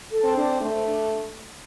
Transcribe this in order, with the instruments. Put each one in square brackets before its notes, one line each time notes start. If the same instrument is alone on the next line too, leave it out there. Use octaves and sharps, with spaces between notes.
[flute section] A4
[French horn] C4
[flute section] D4
[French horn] A3 [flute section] C5
[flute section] D4